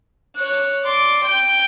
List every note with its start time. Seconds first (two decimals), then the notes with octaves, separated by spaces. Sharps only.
0.36 C#5 F#6
0.84 D5 C6
1.25 G5 G6